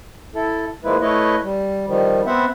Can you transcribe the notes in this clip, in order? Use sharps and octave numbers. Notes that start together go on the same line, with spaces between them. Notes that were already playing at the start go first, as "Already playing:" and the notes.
E4 A4
F3 G#3 A#3 E4 B4
A3 E4 B4 C#5 D#5
G3
D#3 F3 G3
B3 C4 C5 E5 F#5